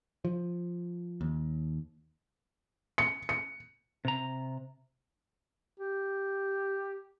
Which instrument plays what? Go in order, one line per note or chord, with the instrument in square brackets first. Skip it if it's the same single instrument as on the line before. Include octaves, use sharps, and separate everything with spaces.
[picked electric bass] F3
D#2
[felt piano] C#7
C#7
[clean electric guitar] C3 A#5
[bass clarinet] G4